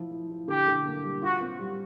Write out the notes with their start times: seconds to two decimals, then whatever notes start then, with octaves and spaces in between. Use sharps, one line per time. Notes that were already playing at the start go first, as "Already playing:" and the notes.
Already playing: F3 E4
0.11 E4
0.30 E4
0.48 D3 G4
0.67 D3
0.86 A#3
1.03 G3
1.22 F4 F#4
1.41 C4
1.59 G3